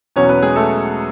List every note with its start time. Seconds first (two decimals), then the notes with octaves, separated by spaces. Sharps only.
0.16 E2 B2 F#3 C#4 C#5
0.29 B3 B4
0.43 G#3 G#4
0.56 A3 A4